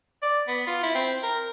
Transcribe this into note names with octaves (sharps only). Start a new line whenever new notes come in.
D5
B3
F4
E4
C4
A#4